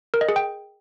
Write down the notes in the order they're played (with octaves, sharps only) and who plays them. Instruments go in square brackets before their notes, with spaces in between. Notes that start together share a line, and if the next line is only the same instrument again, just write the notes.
[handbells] A#4
D#5
G#4
G5